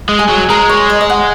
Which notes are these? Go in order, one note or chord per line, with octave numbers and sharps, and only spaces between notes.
G#3
G#4
F#3
G#3 A#4
C#5
D#5
D#5
F#5